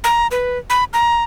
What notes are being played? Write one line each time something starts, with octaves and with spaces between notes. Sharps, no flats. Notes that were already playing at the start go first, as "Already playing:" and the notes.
A#5
B4
B5
A#5